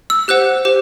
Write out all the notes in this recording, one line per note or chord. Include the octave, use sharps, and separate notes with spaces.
E6
G4 C5 F#5 F#6
G4 C5